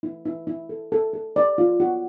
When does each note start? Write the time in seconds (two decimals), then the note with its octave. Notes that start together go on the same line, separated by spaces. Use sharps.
0.03 E4
0.25 E4
0.47 E4
0.69 A4
0.92 A4
1.13 A4
1.36 D5
1.58 F4
1.80 F#4